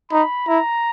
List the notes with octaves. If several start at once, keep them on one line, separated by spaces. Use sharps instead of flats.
D#4 B5
E4 A#5